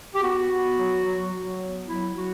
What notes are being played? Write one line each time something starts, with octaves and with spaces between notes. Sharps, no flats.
G4
B3 F#4
B3
F#3
F#3
F#3
B3
F#3 E4
F#3 F#4